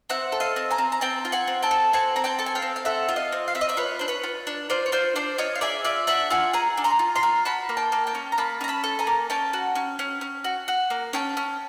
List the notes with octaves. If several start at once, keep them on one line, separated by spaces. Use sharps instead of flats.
C4 E5 F#5
A4
D#5 F5
C4
G#5 A#5
C4
A#5
C4 G5 A5
F4
F#5 G#5
C4
G5 A5
A4
C4 F#5 G#5
C4 A#5
G5 A5
A4 A5
G#5
F5 G5
C4
F5
A4 E5 F#5
F4
D#5 F5
C4
F5
C4 E5
D#5
D5 E5
F4 B4 C#5
D4 C5
B4 C#5
F4
D4
F4 C5 D5
C#5
F4 C5 D5
D4 C5 D5
F4 C#5 D#5
F5
G#4 D5 E5
F4 D5 E5
D4 E5 F#5
F4 F#5 G#5
G#4 G#5 A#5
D4
A#5 C6
F4
A#5 C6
F4
F#4 A5 B5
A#3
G5 A5
A#3
G5 A5
C#4
A#5
A#3 A5 B5
C#4 A#5
A5 B5
A4
G#5 A#5
A#3
C#4 G5 A5
F#4
C#4
C#4
C#4
F#4
F#4
A#3
C#4 G5 A5
C#4